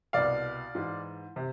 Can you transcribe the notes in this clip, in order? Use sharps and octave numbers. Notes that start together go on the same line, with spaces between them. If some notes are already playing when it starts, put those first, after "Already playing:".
C2 B2 D5 F5
G#2 E3
C3